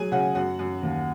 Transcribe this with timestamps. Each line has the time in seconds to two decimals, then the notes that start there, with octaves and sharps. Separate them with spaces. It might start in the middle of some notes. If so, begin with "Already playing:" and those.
Already playing: F#3 G#4 G#5
0.11 C#3 F#4 F#5
0.35 F#2 F#4 F#5
0.59 F#2
0.83 D#2